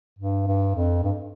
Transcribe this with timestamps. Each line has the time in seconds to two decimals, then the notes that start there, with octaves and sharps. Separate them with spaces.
0.19 G2
0.47 G2
0.75 F2
1.03 G2